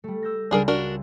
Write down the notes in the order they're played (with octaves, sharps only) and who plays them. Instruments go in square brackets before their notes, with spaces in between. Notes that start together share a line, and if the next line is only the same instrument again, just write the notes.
[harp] G3 A3
E6 G6 A#6
[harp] C#2 G3 [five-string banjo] D4 G#4 A#4
[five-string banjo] D4 F#4 A#4